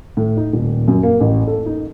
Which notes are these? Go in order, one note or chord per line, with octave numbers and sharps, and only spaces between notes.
A2
D#4
D#1
F#2
A#3
A1
A4
D#4